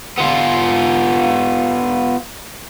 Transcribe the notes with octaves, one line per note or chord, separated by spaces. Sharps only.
B3 F4